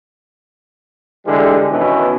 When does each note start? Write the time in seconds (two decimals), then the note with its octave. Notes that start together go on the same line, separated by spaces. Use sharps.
1.26 D3 E3 G3 G#3
1.72 B2 D#3 E3 C#4